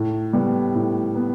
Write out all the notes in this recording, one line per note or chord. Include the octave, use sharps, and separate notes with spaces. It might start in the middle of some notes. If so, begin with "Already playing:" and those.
Already playing: A2
G3 B3
A2
B3